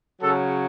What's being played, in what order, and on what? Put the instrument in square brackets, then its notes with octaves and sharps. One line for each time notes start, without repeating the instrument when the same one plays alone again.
[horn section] C#3 F#3 A4